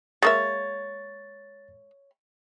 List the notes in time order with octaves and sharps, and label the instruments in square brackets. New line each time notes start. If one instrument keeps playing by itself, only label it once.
[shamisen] G#3 A#3 E5 [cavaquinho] C#5 [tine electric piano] A6